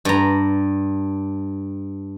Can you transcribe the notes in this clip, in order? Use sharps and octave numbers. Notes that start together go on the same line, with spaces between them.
G2 A#5